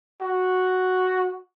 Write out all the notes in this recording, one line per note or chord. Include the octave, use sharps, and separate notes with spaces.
F#4